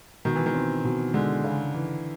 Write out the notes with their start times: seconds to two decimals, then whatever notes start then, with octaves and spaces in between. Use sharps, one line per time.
0.25 B2 D#3
0.36 E3
0.46 D#3
0.54 C4
0.84 B2
1.14 D3 G#3
1.44 C#3
1.74 E3